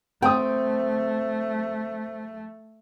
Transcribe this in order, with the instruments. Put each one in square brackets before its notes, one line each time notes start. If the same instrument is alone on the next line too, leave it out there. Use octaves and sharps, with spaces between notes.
[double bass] A3 [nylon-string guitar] C4 [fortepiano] G5 D#6